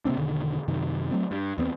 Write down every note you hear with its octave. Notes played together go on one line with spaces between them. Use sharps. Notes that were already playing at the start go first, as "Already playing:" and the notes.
C3 A#3 C4 D4
E1 B2 D3 D#3
F#2 C3 D#3
F#3 A3 C4
G2
E2 B3 C4